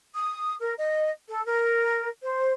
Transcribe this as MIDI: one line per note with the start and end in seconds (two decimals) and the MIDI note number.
0.14 0.54 87
0.60 0.74 70
0.77 1.10 75
1.28 1.43 69
1.45 2.08 70
2.22 2.52 72